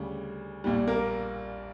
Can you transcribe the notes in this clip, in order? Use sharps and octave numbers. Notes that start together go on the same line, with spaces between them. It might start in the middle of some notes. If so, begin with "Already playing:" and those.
Already playing: D2 C#3 G3
A#1 A#2 G3
A#3 A#4